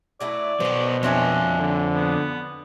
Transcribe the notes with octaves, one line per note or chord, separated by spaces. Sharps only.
F#3 A3 E4 D5
B2 D#3 F#3 B3 C5
F2 C4 D4 C#5 E5 G#5
D3
B3